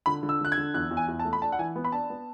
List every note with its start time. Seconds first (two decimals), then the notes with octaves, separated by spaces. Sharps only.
0.06 D3 B5
0.23 D3
0.29 E6
0.41 D3 F#6
0.52 G#6
0.58 D3
0.74 E2 F#6
0.91 E2
0.97 G#5
1.08 E2
1.19 A5
1.25 A3
1.33 B5
1.42 D4 A5
1.52 F#5
1.59 E3 G#5
1.76 B3
1.85 B5
1.92 D4 A5
2.10 B3